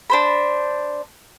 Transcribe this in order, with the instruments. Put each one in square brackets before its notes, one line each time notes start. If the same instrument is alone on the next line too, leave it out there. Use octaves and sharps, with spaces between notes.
[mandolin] D4 C5 B5